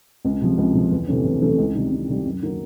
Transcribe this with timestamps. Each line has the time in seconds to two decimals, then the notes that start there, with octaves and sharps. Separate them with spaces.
0.25 C#2
0.41 C3 F3
0.58 C#2
0.74 C3 F3
0.92 E2
1.08 C3 E3 A3 C#4
1.25 E2
1.41 C3 E3 A3 C#4
1.58 C#2
1.75 C3 D#3 G3
1.91 C#2
2.09 C3 D#3 G3
2.25 F#2
2.42 D#3 F#3 A#3 D#4